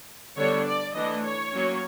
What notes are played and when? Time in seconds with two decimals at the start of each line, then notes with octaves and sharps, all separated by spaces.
0.37 D3 G3 B3 D4 C#5
0.66 D5
0.95 E3 A3 D4 D#5
1.23 C#5
1.52 F#3 A#3 C#4